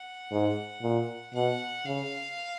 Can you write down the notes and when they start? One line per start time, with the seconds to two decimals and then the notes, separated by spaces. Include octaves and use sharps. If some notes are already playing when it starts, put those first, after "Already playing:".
Already playing: F#5
0.31 G#2
0.82 A#2
1.34 B2 F#5
1.86 C#3 F5